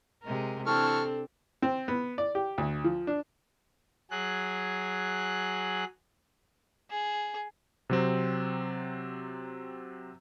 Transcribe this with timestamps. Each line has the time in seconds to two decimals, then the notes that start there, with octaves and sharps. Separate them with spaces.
0.24 C3 G#3 A#4
0.66 E3 C4 D4 A4 A5 C#6 F6
1.62 C4
1.88 B3
2.18 D5
2.35 G4
2.58 D2
2.84 F3
3.07 D4
4.11 F#3 G#4 F#6
6.91 G#4
7.90 C3 F#3 C4